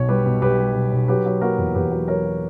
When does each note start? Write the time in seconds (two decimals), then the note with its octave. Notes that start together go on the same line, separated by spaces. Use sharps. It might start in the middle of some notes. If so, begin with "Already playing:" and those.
Already playing: B1 B2 C#5
0.09 G3 G4 B4
0.26 B2
0.42 B1 G4 B4
0.60 G3
0.75 B1
0.92 B1
1.08 F#3 G4 B4
1.26 F#3
1.41 A#3 F#4 A#4
1.58 E2
1.74 E2 G4 B4
1.91 F#3
2.08 F#3 A#4 C#5
2.25 F#3